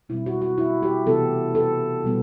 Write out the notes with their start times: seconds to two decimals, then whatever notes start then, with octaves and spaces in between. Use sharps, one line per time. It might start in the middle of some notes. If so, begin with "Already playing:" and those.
0.09 B2 G3 C4 E4
0.26 F#4
0.42 F#4
0.58 E4
0.83 G4
1.07 C3 E3 B3 A4
1.55 A4
2.03 B2 G3 B3